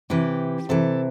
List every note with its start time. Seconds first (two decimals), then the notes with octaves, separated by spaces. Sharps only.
0.10 C3 E3 G4
0.69 C3 E3 A4